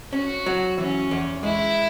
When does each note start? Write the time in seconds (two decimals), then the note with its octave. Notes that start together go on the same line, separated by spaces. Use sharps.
0.13 C#4 F#4
0.46 F#3
0.78 E3 C#4
1.11 E2
1.43 G#3 E4